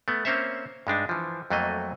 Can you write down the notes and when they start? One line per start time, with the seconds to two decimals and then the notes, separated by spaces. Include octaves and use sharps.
0.08 A3 B3
0.25 A#3 C4 C#4 C5 C#5 E5
0.87 G2 G#3 D4 D#4
1.09 E3 F3
1.50 F2 F#3 A3 A#3 D#5